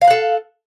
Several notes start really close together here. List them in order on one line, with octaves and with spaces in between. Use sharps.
F5 A#5 F#5 A4